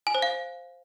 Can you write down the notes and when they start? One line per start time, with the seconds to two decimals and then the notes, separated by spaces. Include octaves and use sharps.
0.07 G#5
0.15 C5
0.22 F5